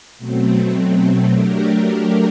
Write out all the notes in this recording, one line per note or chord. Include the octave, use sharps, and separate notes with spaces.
B2 F#3 A3 C4
F#3 A3 D4 G4 A#4